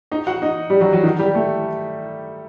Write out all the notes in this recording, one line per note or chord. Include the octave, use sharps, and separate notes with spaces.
D#4 D#5
F#4 F#5
D#4 D#5
G3 G4
F#3 F#4
F#3 F#4
D#3 D#4
G3 G4
A3 A4